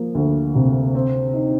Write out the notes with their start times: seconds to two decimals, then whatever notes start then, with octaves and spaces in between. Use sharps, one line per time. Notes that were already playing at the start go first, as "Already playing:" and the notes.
Already playing: F3 A#3
0.15 D2
0.55 C3
0.95 C4
1.34 D#4